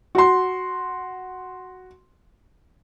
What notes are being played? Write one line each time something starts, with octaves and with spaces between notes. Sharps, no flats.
F#4 C6